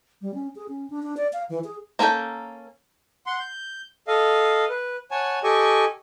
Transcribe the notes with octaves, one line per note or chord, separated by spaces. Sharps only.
G3
C#4
G#4
C#4
D4
D4
D5
F5
E3
G#4
A#3 C#4 A4 A#4 G5
F#5 C6
G6
A4 D#5 F5
B4
C#5 F#5 G#5 A5
G4 A4 D#5 G#5 C#6